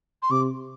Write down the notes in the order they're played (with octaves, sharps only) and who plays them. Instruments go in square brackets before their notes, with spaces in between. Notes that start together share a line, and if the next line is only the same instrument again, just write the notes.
[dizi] C6
[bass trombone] C3 [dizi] D6